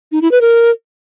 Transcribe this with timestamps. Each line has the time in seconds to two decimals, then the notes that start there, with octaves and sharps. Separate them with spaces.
0.12 D#4
0.22 E4
0.31 B4
0.41 A#4